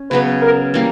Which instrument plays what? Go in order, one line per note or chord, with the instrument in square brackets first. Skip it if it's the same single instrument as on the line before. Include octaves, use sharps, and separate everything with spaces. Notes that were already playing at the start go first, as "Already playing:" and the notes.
Already playing: [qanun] C#4
[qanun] C#3 F#3 B3 [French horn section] B4
[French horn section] A#4
[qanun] E3 G3 A#3